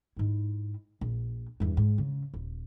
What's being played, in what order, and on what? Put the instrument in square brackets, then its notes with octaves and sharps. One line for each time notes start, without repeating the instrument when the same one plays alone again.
[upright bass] G#2 E4
A#1
E2 G2
G#2
C#3
D#1